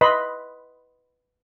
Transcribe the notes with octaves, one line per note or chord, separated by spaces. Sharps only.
B4 D#5 B5 C6